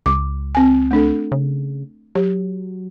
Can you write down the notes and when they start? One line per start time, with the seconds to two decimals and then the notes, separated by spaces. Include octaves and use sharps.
0.06 C#2 D6
0.55 C4 G#5
0.91 A3 D4 A4
1.32 C#3
2.15 F#3 G4